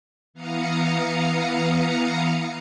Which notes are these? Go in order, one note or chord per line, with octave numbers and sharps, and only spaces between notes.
E3 B3 F5 A#5 D#6 C#7